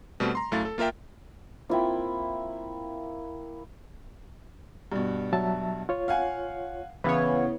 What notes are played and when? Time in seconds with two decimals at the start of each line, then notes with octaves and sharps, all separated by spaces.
0.20 B2 G3 A3 C4
0.35 A#5 C6
0.52 F#2 A3 E4 F5 A6
0.65 A4
0.78 A#3 F4 A#4 E5 G5
1.69 A#3 C4 E4 F4 G5
4.92 G2 B2
5.33 F#3 E5 A5
5.89 F4 C#5
6.08 F5 F#5 G#5
7.04 C#3 E3 B3 B4 C#5 F5